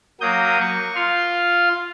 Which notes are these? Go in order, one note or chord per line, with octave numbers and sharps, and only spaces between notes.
F#3 A#3 D#6 G6
C#6
F4 F5 C6